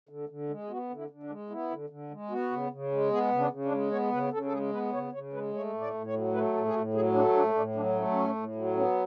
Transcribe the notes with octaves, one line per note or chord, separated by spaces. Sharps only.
D3
D3
G#3
G#4
B3 F#4
D3
E4
D3
D4
G#3
B3 E4
D3
D3
G#3
B3 F#4
C#3
C#3
G#3
B3 G#4
C#3
D4
C#3
D4
G#3
B3 C#5
C#3 B4
C#3 A4
A4
G#3 G#4
B3 B4
C#3 C#5
C#3 C#5
G#3 B4
A3 C#5
A2
D5
A2
C#5
F#3
A3 B4
A2 A4
G#4
A2 F#4
F#3 G#4
A3 D4
A2 D4
A2 D4
F#3 D4
A3 C#4
A2 C#4
A2
F#3
B3 C#4